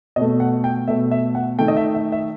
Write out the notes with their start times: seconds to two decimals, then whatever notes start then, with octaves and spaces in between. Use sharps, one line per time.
0.16 B2 A3 D#5
0.40 F#5
0.64 G5
0.88 B2 A3 E5
1.11 E5
1.35 F#5
1.59 D#3 A3 G5
1.68 D#5
1.77 E5
1.95 E5
2.12 E5